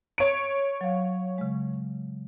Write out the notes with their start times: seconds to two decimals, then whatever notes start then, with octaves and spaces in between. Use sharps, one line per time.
0.18 C#5 D7
0.81 F#3 F5
1.38 C#3 G#3